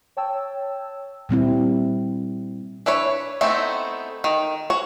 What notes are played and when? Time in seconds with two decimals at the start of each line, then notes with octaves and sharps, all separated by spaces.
0.17 C#5 G5 A5 E6
1.29 A#2 G3 C4 E4
2.86 D4 E4 B4 C#5
3.41 A3 B3 C4 D#4 E4
4.24 D#3
4.70 F#4 C#5